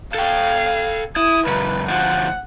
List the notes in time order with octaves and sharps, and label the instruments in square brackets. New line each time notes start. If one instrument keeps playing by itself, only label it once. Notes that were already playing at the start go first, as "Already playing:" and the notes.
[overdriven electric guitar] A4 G5 [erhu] F5
[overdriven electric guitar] E4 [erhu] D#6
[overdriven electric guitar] C#2 F#2 [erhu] B4
[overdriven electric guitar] D2 F3 [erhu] F#5